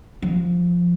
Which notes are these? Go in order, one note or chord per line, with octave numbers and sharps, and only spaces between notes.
F3